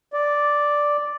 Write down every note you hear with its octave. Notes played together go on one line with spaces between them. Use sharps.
D5